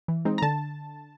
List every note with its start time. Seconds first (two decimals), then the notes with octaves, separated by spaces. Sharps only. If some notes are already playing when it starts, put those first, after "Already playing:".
0.08 E3
0.25 G#3 C4 D#4
0.38 A#5
0.42 D3 A5